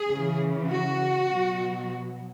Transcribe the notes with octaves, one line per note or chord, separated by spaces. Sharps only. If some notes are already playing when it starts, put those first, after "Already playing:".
Already playing: G#4
C#3 E3
F#4
B2 F#3